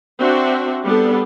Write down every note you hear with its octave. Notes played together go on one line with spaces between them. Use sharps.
C4 D4 F#4 E5
G3 B3 D4 A4